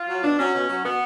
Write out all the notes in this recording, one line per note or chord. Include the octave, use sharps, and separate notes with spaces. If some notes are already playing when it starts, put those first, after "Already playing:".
Already playing: F4
F#3
B2 D4
F#3 C#4
B2
F#3
B2 B3